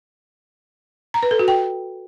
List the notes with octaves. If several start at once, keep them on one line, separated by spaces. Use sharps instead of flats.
A#5
B4
A4
F#4
G5